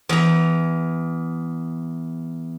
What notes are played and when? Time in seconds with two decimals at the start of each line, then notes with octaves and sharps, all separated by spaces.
0.09 E2 A#5